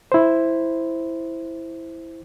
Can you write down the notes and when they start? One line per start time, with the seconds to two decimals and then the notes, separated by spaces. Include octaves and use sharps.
0.12 E4 C5